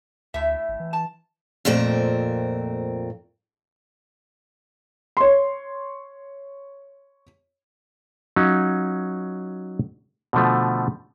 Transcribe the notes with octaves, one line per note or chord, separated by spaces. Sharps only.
D2 A2 E5
G#1
E3
A5
F2 A#2 A3 C4 A#4
C#5 C6
F#3 C#4 D#4 F4
B2 D3 F3 A3